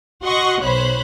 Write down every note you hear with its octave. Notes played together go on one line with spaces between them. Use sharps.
F#4 D#5 F#5 C6 C#6
B1 C5 C#5 B5 F#6